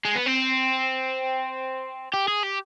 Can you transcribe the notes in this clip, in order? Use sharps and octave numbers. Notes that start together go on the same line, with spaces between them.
G#3
B3
C4
G4
G#4
G4